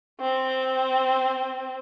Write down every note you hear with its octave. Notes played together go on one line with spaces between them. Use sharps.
C4